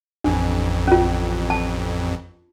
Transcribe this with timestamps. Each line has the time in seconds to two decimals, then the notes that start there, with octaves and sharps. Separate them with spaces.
0.24 A1 F2 D4
0.87 C#4 F4
1.50 A5